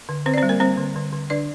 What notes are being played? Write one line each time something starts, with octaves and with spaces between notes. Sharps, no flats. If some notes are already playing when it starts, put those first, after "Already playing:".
D3
D3 C4 C5
D5
C4 C5
G3
A#3 A#4
G3 C4 C5
D3
D3
D3
D3 D4 D5